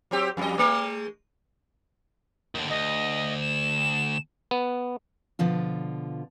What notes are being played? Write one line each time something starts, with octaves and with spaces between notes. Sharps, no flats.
F#3 C4 G4
F2 G3 D#5
G#3 A3
D#2 D3
D2 D#5
E7
B3
B2 D3 F3 F4